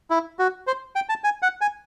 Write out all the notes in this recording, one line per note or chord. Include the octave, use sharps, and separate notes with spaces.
E4
F#4
C5
G5
A5
G#5
F#5
G#5